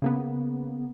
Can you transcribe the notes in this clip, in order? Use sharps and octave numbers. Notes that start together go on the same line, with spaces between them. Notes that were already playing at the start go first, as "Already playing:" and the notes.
C#3 A#3 B3